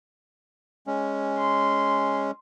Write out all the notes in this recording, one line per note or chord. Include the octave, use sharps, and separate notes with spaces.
G#3 C#4
C6